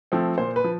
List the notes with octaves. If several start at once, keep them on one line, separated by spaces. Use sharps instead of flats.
F3 A3 C4
A#2 C5
B4
F3